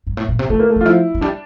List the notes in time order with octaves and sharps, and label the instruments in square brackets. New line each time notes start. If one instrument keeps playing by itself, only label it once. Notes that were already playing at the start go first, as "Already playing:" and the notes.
[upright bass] G2
A2
A#2
C3
[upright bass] D3 [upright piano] A3
[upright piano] A#3
A3
[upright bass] E3
[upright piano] F4
[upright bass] F3 [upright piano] E4
[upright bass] F3
[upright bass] G3 [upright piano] D4